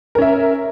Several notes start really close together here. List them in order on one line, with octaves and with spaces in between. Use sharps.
A#4 C#4 E5